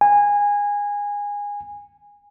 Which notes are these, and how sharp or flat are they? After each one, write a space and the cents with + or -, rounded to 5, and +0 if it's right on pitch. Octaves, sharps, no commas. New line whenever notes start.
G#5 -20